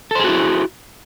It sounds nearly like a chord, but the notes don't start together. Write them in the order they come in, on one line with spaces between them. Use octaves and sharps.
A4 C5 G#4 F#4 E4